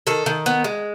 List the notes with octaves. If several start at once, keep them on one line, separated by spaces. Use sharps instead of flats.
D#3 A4
D#3
B3
G#3